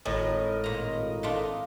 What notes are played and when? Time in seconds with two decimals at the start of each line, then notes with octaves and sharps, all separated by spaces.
0.05 G#1 A2 A#4 D#5
0.64 A#2 A#5
1.23 A3 D4 F4